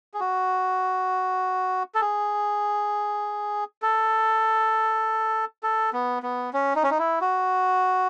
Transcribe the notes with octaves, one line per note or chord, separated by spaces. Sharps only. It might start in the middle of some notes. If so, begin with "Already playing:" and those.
G#4
F#4
A4
G#4
A4
A4
B3
B3
C#4
D#4
C#4
D#4
E4
F#4